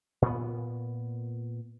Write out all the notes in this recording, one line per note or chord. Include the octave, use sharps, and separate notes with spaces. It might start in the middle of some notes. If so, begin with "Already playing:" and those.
A#2 B3